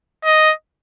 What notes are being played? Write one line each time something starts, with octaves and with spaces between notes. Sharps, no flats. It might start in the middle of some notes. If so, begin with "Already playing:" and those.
D#5